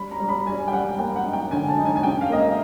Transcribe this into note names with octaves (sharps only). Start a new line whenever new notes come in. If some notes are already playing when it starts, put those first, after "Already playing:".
Already playing: G3 B5
A#5
G3
B5
G3 G#5
G5
G3 F#5
A#3 G5
F#5
D#4
G5
D3 G#5
A5
D#4
G#5
G#5
C#3 G5
F5
A#3 D#5
E5